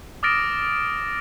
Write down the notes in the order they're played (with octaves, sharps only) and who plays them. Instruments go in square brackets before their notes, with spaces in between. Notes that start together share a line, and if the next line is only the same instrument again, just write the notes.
[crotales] D6 D#6 F6 A6 A#6 D7